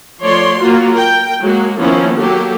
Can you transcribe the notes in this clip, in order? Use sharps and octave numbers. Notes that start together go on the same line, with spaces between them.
F3 A3 C#5 D5 C6
F#3 A#3 F4 F#4
A#4 G5
F#3 G#3 A#3 F#4
D#3 F3 A#3 B3 C#4 E4
F#3 A#3 G4 A4